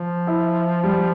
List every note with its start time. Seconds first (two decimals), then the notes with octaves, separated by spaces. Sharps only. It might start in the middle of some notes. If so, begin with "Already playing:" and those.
Already playing: F3
0.27 E4
0.84 G3